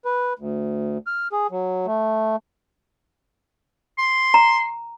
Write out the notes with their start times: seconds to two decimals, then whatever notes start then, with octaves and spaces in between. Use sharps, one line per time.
0.05 B4
0.39 D2
1.07 F6
1.32 G#4
1.51 F#3
1.86 A3
3.98 C6
4.34 A#5